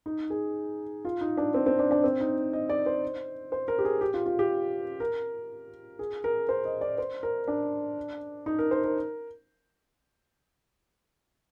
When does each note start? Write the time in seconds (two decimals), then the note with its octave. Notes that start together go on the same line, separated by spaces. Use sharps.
0.06 D#4
0.30 G#4
1.05 F4
1.21 D#4
1.37 D4
1.54 C4
1.66 C4
1.79 D4
1.91 D4
2.04 C4
2.21 D#4
2.53 D#5
2.70 D5
2.86 C5
3.52 C5
3.68 A#4
3.78 G4
3.85 G#4
4.01 G4
4.14 F4
4.26 F4
4.39 G4
5.00 A#4
5.99 G#4
6.24 A#4
6.49 C5
6.65 D#5
6.81 D5
6.98 C5
7.23 A#4
7.48 D4
8.46 D#4
8.59 A#4
8.71 C5
8.84 A#4